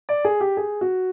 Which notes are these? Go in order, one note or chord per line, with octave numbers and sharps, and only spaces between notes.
D5
G#4
G4
G#4
F#4